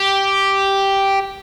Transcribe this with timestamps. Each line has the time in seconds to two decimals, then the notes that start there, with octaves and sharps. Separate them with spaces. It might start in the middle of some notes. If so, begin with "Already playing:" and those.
Already playing: G4